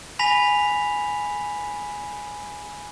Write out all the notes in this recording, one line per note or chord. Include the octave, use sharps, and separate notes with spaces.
G#5 B5 A#6 B6 F7